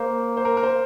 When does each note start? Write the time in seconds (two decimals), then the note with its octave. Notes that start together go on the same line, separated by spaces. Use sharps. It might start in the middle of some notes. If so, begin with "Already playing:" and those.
Already playing: A#3 C5
0.37 C5
0.45 A#4
0.57 A#4
0.63 C5